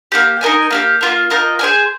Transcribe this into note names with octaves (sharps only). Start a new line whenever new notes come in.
A#3 D#4 G4
D#4 A#4 D#5 G#5
A#3 D#4 G4
A#3 F4 A#4
F4 A#4 D#5 G5
G#4 C5 D#5 G#5